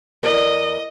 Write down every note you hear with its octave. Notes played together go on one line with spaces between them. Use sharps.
E2 A#4 D5 D#5